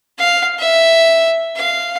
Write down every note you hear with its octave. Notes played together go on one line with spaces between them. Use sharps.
F5
E5
F5